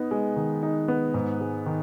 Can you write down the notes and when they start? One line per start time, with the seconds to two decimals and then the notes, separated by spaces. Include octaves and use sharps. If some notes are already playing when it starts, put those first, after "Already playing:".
Already playing: B3 D#4
0.11 G#3
0.36 D#3
0.63 D#4
0.88 B3
1.14 G#2
1.41 G#3
1.66 D#3